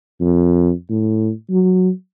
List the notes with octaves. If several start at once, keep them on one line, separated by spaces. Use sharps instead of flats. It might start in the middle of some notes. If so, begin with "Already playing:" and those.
F2
A2
F#3